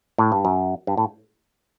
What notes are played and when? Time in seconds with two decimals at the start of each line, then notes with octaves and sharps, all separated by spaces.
0.18 A2
0.32 G2
0.45 F#2
0.87 G2
0.97 A2